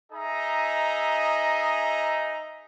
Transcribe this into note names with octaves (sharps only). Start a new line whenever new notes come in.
D#4 G#4 D#5 E5 A#5